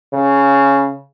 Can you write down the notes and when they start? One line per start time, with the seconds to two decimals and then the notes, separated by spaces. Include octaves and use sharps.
0.13 C#3